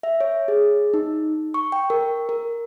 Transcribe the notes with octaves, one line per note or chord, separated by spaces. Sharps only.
E5
C#5
G#4
D#4
C#6
G5
A#4
A#4